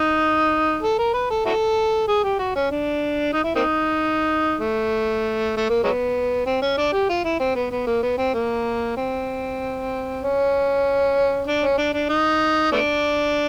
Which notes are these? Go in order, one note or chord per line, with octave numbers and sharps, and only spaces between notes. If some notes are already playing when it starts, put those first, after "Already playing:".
Already playing: D#4
A4
A#4
B4
A4
E4 F#4 A4
G#4
G4
F#4
C#4
D4
D#4
E4
A#3 C4 D#4
A3
A3
A#3
F#3 G#3 B3
C4
C#4
D4
G4
F4
E4
C4
B3
B3
A#3
B3
C4
A#3
C4
C#4
D4
C#4
D4
D4
D#4
A3 B3 D4